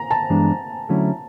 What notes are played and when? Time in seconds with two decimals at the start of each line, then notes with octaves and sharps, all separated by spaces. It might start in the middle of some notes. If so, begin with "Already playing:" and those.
Already playing: A#5
0.11 A5
0.30 G2 E3 G#3 B3 D4
0.89 D3 F#3 A3 C#4 E4